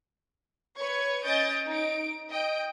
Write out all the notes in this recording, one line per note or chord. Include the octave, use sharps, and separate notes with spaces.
B4 C#5 C#6 G#6
C#4 D#5 G6 A6 D7
D#4 D7
D#5 G5 D7